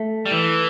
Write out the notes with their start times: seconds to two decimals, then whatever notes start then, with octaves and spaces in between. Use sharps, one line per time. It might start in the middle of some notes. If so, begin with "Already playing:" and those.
Already playing: A3
0.26 G3
0.31 E3